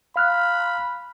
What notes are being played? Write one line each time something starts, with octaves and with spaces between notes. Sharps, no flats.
F5 B5 F6 F#6